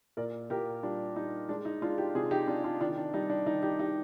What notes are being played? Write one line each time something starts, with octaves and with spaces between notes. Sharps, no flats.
A#2 A#4 D5
A#2 G4 A#4
G3 D4 F4
G3 D#4
G#3 D4
D#4
G#3 D4 F4
D#4 G4
C3 F4 G#4
D#4 G4
C3 D4 F4
D4 F4
D#3 D4 F4
D4
G3 D#4
D4
D#3 D#4
D#4 G4
D#4 G4